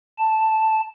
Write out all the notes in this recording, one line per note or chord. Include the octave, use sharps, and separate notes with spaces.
A5